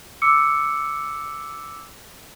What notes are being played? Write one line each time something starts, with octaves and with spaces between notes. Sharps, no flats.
D6 E6 C#7